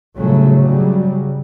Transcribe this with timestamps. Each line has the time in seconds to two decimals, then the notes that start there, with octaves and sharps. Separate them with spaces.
0.16 G1 A2 C#3 F#3 A3
0.61 C#3 F#3 G3